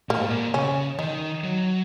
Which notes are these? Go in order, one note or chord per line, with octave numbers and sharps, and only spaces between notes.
A#2 A#3
G#2
A#2
C#3 C#4
D#3 D#4
F#3